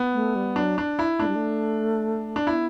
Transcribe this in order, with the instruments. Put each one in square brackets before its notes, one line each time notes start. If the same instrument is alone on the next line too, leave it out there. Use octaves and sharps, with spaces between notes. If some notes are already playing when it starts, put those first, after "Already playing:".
Already playing: [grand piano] B3
[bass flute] A3
G3
[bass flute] F#3 [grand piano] D4
[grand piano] D4
E4
[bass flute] A3 [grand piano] D4
[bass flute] G3
A3
[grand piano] D4
[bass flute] B3 [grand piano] E4